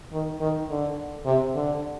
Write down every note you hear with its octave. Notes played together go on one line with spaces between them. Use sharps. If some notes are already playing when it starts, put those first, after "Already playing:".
D#3
D#3
D3
C3
D3